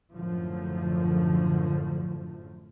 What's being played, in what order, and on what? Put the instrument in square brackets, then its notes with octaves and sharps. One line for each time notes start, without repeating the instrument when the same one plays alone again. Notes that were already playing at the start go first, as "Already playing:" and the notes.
[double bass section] F#2 A2 D3 F3